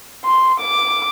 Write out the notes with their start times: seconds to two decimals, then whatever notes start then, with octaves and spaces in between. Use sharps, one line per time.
0.25 C6
0.60 D6